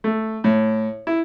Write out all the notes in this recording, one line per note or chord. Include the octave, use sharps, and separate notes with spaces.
A3
A2
E4